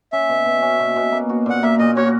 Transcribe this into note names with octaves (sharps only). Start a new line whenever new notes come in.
C#4 E5
B2
B2
C#4
B2
B2
A#3
F#4
A#2 F#5
A#3 E5
A#2 D#5
F#4 C#5